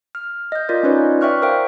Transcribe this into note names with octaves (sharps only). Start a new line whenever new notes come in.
F6
D#5 G6
F4 A#4 D5 D#5
C#4 D#4 F4 B4 C#5 D5
D5 E5 G5 C#6 F6 F#6
A#4 C5 E5 F5 G5